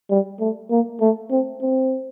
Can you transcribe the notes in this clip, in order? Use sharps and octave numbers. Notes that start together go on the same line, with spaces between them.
G3
A3
A#3
A3
C4
C4